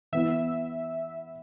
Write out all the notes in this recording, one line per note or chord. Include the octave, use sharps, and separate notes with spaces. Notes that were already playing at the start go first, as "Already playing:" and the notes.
E3 B3 E4 E5